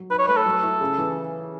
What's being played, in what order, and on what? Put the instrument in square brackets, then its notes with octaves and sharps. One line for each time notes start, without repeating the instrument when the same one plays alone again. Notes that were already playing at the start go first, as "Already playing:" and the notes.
Already playing: [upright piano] F#3
[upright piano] D#4 [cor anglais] B4
[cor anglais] C#5
[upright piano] A3 [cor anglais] B4
[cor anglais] A4
[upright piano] F#3
E4
C#3
E3